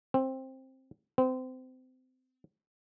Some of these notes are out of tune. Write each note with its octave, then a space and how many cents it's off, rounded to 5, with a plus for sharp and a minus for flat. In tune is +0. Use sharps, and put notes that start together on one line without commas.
C4 +10
C4 -30